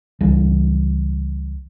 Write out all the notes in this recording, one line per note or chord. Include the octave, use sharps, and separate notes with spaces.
C#2 E3 G3